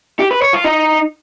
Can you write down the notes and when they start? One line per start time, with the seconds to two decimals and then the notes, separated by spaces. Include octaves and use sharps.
0.20 G4
0.31 B4
0.42 C#5
0.53 F4
0.64 D#4